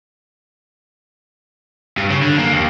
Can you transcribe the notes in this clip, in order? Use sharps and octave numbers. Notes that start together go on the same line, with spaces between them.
G2
C#3
D3
F#2 A#3
D#2